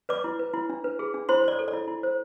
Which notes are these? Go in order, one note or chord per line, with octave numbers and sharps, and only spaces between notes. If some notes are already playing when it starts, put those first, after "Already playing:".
B4 D5 D6
E4
B4
E4
D4
B4
G#4
D4
E4 C5 C6
C5 D5
A4
D5
E4
E4
C5